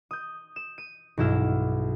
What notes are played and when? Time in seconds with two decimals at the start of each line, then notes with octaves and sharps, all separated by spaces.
0.11 D#6 G6
0.56 E7
0.78 D#7
1.17 B1 G2 F#3 E4 E6 F6